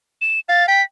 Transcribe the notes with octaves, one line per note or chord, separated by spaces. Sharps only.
E7
F5 A6
G5 B6